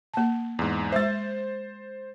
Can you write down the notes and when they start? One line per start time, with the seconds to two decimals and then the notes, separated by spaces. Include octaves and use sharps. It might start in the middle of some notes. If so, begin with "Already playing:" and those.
0.14 A#3 A5
0.59 E2 G#2
0.92 G#3 C5 E5 A6